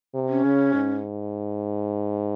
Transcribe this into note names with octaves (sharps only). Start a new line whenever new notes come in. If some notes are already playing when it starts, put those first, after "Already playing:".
C3
C#4
C#3
G#2